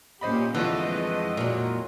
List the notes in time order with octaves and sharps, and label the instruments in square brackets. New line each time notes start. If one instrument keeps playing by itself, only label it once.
[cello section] A#2 C#4 G4 [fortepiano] C5 D#5 B5
[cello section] F2 G#3 D#5 [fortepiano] D3 F3 A3 [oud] E3
[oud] A#2 F#3